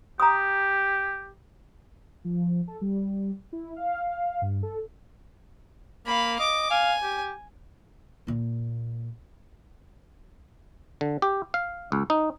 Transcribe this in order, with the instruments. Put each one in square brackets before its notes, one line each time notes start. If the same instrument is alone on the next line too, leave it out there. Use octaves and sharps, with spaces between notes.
[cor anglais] G4 [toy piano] A#5 D#6
[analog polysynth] F3
A4
G3
E4
F5
G2
A4
[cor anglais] A#3 [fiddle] F5 B5
[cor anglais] D#5 [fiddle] D6
[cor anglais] F5 [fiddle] G#5
[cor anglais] G4
[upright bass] A#2 A#3
[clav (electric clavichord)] D3
G4
F5
C#2
D#4